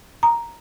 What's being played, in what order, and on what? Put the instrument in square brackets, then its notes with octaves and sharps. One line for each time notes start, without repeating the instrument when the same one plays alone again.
[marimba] A#5